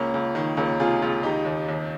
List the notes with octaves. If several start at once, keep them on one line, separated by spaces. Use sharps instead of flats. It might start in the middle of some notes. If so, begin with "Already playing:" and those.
Already playing: C#2 A#3 C#4
C#2
D#3
C#2 A#3 C#4
C3 F4 G#4
C#2 F4 G#4
D#3 D#4 G4
D#2
D#2